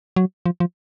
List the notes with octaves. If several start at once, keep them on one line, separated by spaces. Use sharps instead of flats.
F#3
F3
F3